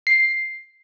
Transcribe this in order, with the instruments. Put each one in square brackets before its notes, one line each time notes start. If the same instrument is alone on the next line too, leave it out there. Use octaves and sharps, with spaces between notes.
[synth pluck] C7